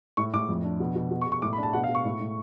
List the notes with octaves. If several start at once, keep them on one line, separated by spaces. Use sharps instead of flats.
A2 C#6
A2 D6
F2
D4
B2
B2
B2
C#6
B2
C#6
A2 D6
B5
D4
A5
B2 F#5
F5
B2
C#6
A2
A2